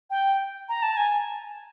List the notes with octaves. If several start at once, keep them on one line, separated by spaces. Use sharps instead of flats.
G5
A#5
A5
G#5